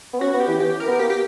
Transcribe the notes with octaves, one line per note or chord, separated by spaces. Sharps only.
B3
C#4 F#4
B3
G4
E3
E3 G4
A#4
B3
A#3 G4
G4